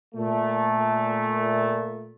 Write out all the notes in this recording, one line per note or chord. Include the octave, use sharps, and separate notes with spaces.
A#2 A3